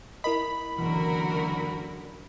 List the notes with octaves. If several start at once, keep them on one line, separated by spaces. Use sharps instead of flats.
E4 A#4 D#5 B5
F#1 D3 E3 F#4 A#4